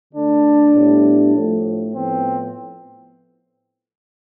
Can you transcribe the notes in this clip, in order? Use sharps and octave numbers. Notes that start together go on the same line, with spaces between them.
D3 A3 D4
A2 G3 B3
A2 F3 A3
A2 F3 B3 C4